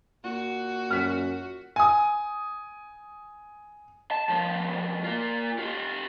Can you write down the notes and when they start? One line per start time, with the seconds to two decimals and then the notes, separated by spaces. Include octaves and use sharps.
0.24 A#2 F#4
0.90 F#2 F6 B6
1.76 G#5 D#6
4.11 A5
4.29 C2 F3
5.04 A#3 F4
5.58 F4 G4